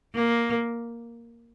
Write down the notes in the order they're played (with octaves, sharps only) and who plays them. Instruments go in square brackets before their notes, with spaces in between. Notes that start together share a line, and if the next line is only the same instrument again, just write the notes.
[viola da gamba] A#3